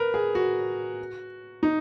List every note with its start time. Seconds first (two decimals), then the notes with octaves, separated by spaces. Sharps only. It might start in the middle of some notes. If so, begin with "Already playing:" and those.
Already playing: A#4 B4
0.14 G#4
0.35 F#4
1.63 D#4